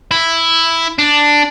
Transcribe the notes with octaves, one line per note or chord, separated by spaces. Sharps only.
E4
D4